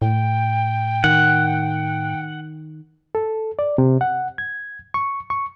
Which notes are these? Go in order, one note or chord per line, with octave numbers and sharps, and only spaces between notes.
A2 G5
D#3 F#5
A4
D5
C3
F#5
G#6
C#6
C#6